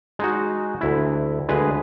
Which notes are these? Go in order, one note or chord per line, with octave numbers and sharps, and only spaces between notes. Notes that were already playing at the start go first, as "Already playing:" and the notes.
G#3 D#4 F#4
D2 E4
D2 G#3 G#4 B4